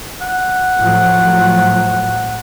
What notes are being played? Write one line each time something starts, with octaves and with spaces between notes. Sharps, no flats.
F#5
A2 F3 F#3